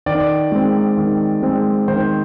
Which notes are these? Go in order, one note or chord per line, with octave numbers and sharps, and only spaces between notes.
D#3 D5
G#3 C4
D#3
G#3 C4
D#3 C5